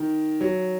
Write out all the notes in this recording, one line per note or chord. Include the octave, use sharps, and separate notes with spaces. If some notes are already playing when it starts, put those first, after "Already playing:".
Already playing: D#3
F#3